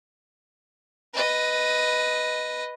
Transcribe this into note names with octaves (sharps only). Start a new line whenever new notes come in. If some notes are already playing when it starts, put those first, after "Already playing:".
B4 D#5